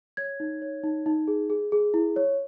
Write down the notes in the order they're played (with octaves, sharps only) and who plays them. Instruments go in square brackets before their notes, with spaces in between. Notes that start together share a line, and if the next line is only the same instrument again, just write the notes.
[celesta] C#5 G#6
D#4
C#5
D#4
D#4
G#4
G#4
G#4
E4
C#5